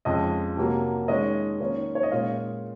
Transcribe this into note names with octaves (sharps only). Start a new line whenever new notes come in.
F2 C#3 F3 G#3 D#5
C3 F#3 A#3 F4
D#3 G#3 C#4 D#5
D#3 A#3 C#4 F4
C#5
D#5
A#2 G#3 C#4 F4 F5